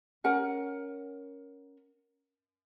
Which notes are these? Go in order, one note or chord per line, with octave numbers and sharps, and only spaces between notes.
C#4 A#4 F#5 G#5